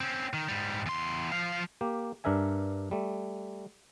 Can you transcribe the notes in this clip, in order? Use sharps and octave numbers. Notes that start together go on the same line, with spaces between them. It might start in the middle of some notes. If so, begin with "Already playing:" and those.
C4 C#4
D#3
G#2 G3
E2 C6
F3 F5
A#3 G4
G2 D4 A#4 E5 G#5
G3 A3